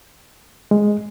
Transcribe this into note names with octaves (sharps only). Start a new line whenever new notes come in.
G#3